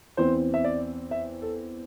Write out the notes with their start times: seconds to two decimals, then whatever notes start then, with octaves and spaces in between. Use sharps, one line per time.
0.17 E2 E3 C4 C5
0.54 E5
0.64 D5
1.11 E5
1.42 A4